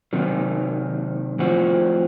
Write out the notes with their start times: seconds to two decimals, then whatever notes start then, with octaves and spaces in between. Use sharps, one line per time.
0.13 C3 D#3 F#3
1.39 A2 F3 C4 F#4